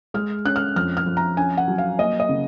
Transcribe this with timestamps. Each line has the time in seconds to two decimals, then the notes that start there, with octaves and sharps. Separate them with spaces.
0.14 G#3 F6
0.45 C#4 F#6
0.56 F6
0.76 F2 F6
0.97 F6
1.06 F2
1.17 A#5
1.37 C#4 G#5
1.58 F#5
1.68 F#3
1.78 F5
1.98 A#3 D#5
2.20 D#5
2.29 C#3